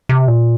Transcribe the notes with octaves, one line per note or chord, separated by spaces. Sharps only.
C3
A#2